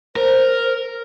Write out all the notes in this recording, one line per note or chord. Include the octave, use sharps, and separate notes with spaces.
A#4 C5